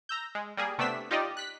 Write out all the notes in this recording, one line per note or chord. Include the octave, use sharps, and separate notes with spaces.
A#5 E6 G6
G#3
G3 A#3 G#4
C3 A3 B3 D4 E6 B6
D#4 F4 G4 D5 D#5
F#6 B6